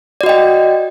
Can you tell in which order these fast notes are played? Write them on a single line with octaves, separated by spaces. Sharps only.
D5 F#4 D#5 G5